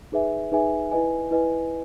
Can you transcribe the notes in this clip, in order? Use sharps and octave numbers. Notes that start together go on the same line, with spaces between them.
D#4 G#4 B4 E5 G#5
D#4 G#4 B4 E5 G#5
E4 B4 D#5 G#5
E4 B4 D#5 G#5